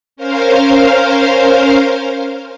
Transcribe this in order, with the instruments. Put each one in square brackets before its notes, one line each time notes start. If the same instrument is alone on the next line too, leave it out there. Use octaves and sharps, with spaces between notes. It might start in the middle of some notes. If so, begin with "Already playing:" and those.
[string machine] C#4 A#4 C5 F5